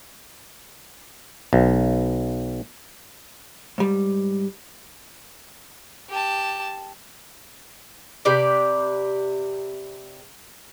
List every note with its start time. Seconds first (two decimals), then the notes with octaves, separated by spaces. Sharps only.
1.53 B1
3.78 G#2 G3
6.10 G4 A5
8.25 C3 G4 B4 D5